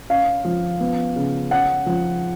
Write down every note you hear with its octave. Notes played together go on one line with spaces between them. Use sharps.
C#4 F5
F3
B3
C#3
C#4 F#5
F3